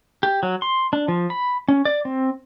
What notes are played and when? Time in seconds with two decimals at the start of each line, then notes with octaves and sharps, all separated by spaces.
0.23 G4
0.43 F#3
0.62 C6
0.93 D4
1.08 F3
1.30 B5
1.68 C#4
1.85 D5
2.05 C4